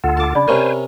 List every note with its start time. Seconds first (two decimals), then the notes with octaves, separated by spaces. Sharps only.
0.04 D2 F4 A4 F#5
0.17 A5 D6
0.35 C#3 D4 D5 B5
0.48 C3 C#4 A#4 C5 G#5